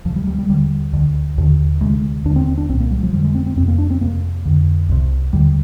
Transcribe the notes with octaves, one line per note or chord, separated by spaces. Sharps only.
D2 C3 F3
G3
G3
G3
D#2 D3 G3
D2 D3
D#2 D3
D2 C3 G#3
D#2 D3 D4
C4
C4
D4
C2 A#2 C4
A#3
G3
F3
F2 D3 G3
G#3
C4
C4
F2 C3 C4
A#3
D4
C4
F2 C3 A#3
F2 D3
C2 C3
D#2 D3 G3